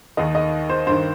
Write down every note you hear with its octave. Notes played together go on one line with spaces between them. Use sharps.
D#2 D#3 D#5
D#5
C5
G2 D#3 C5